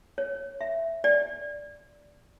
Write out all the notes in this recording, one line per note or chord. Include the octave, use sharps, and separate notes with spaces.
C#5
E5
D5